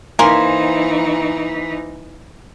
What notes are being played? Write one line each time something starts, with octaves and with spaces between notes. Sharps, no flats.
E3 A#3 D#4 C5 G#5